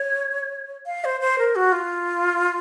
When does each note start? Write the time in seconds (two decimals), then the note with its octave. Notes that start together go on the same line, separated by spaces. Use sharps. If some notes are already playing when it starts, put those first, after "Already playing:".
Already playing: C#5
0.86 F5
1.05 C5
1.21 C5
1.38 A#4
1.55 F#4
1.72 F4